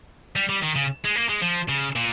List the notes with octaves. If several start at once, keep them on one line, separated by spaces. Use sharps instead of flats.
G3
G3
D#3
C#3
G#3
A#3
G#3
F3
C#3
A#2